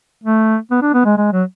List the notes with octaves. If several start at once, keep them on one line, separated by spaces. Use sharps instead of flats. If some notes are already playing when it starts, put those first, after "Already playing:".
A3
B3
D4
B3
G#3
G#3
F#3